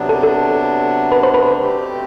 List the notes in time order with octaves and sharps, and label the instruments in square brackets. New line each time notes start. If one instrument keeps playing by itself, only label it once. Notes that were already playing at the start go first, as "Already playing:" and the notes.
Already playing: [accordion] C3 F#3 B3 D4
[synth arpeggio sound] A4
A4
B4
C5
B4
[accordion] B2 A3 C4 G4